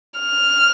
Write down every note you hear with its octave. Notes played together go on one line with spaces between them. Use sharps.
F6